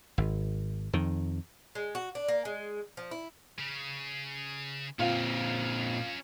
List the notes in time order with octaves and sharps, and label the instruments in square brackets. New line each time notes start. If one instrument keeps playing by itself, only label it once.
[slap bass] G#1
F2 D#3
[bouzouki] G#3
F#4
D4
A#3
G#3
F3
E4
[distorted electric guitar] C#3
[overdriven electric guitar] A#2 C4 [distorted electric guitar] C#4 A#4 [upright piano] F4 F5